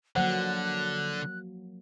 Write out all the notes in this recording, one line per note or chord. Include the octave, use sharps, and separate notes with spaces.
D3 F3 F#3 A#3 C5 F#5 F#6